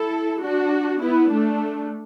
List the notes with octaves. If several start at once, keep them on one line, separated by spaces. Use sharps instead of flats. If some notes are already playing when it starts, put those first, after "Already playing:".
Already playing: E4 A4
D4 F#4
B3 E4
A3 D4